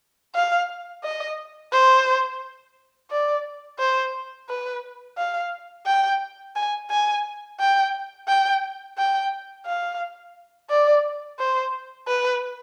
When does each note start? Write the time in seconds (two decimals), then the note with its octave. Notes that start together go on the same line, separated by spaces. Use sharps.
0.35 F5
1.04 D#5
1.72 C5
3.11 D5
3.79 C5
4.49 B4
5.18 F5
5.86 G5
6.56 G#5
6.90 G#5
7.60 G5
8.28 G5
8.98 G5
9.66 F5
10.70 D5
11.39 C5
12.08 B4